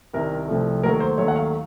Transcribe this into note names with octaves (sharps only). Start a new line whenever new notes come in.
C2 C3 D#3 A#4
C2 C3 F3 A3
D#2 D#3 F#3 A3 A#4
C5
D#2 D#3 F#3 A3 C#5
F#5
F5